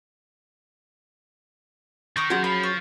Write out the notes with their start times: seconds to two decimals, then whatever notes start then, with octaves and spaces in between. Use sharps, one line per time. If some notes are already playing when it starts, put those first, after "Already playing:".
2.17 D#3 C#6 D#6
2.30 F#3 C#4 G#4 C#5 F#5 C6
2.44 F3 B5
2.63 C#6